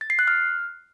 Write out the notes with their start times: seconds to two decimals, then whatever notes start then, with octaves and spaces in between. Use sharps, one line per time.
0.01 A6
0.10 C7
0.19 F#6
0.28 F6